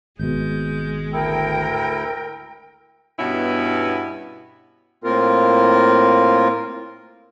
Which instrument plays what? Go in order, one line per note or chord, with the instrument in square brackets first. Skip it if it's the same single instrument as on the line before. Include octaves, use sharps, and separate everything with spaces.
[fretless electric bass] G#1 B2 [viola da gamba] G#3 [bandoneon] G6
[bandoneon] D2 E4 A4 [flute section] A#4 G5
[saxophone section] G2 B2 B3 C#4 E4
[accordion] A2 A#3 C4 F4 A#4